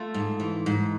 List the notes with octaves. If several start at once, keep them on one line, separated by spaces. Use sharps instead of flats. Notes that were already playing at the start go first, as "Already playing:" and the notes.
Already playing: A3 F4 A4
G#2
E3
G#2